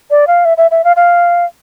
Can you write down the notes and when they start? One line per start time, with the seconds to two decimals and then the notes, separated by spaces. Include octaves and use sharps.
0.11 D5
0.27 F5
0.45 E5
0.57 E5
0.71 E5
0.84 F5
0.96 F5